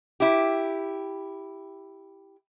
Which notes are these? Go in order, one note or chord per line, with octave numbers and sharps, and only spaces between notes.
E4 G4